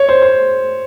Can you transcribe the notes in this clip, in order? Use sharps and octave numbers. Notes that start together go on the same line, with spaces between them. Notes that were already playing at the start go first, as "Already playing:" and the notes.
Already playing: C#5
C5
C5